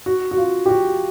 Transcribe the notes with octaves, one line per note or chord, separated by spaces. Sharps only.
F#4
F#4
F4
G4
F#4